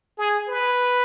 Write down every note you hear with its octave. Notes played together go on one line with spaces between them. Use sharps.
G#4
B4